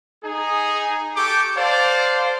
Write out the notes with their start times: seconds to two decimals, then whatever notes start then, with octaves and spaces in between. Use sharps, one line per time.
0.24 D#4 G#4
1.16 G4 A4 G5 C#6 D6
1.57 A4 C5 D5 F5